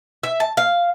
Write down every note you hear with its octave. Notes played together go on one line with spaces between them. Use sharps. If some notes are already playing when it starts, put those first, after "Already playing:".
E5
A5
F5